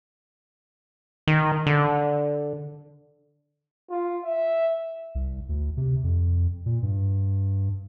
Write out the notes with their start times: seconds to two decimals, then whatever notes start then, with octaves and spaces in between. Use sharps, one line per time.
1.28 D#3
1.67 D3
3.90 F4
4.24 E5
5.15 C2
5.49 D2
5.77 C3
6.04 F2
6.66 A#2
6.82 G2